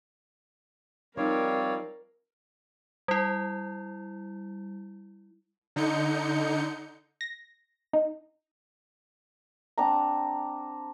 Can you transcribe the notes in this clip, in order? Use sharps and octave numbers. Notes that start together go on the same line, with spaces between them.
F3 G3 C4 D#4 A#4 C#5 D5 F5
G3 E4
D3 D#4 G6 C#7
A#6
D#4
C4 D4 F#5 A#5